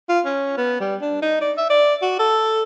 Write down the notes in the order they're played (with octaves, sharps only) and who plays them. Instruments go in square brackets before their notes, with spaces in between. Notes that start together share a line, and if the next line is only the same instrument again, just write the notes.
[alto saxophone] F4
C#4
B3
G3
D4
D#4
D5
E5
D5
F#4
A4